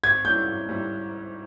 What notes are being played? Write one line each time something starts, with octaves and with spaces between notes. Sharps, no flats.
G#1 G#6
G#2 G3 C#4 E4 G6
G#1
G#2 G3 C#4 E4